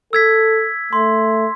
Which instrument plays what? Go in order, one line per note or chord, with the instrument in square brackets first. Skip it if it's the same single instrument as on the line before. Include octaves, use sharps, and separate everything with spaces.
[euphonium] A4 [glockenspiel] E6 G#6 B6
[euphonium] A3 [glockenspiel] C6